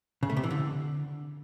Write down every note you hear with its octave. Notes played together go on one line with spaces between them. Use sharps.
C#3
A3
C3
E3
D3